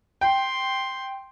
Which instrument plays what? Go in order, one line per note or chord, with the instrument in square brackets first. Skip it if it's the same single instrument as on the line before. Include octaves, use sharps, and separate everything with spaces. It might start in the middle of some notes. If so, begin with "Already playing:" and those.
[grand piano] G5 [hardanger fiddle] C6